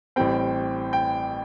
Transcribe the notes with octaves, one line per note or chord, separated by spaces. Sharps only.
A1 A2 G3 C4 G5
G5